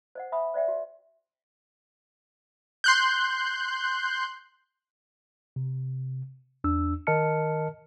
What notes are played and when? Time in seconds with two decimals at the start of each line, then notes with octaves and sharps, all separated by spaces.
0.15 C5 D#5 F#5
0.32 E5 G#5 B5 D#6
0.54 C5 D5 E5 G5
0.68 F#4
2.84 C6 F#6 G6
5.56 C3
6.64 E2 D4 E6
7.07 D#3 A#4 D#5 A5 F6 C#7